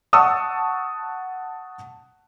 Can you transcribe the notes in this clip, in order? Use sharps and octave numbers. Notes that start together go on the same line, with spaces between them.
F#5 A5 C#6 D#6 E6